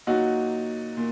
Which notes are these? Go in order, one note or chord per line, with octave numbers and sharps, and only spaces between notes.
A#2 F#3 A#3 D#4 F#4
A#2